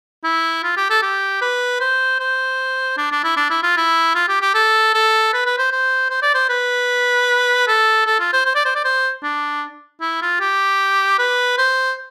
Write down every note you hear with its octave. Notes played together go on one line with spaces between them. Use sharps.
E4
F4
G4
A4
G4
B4
C5
C5
D4
D4
E4
D4
E4
F4
E4
F4
G4
G4
A4
A4
B4
B4
C5
C5
C5
D5
C5
B4
A4
A4
F4
C5
C5
D5
C5
D5
C5
D4
E4
F4
G4
B4
C5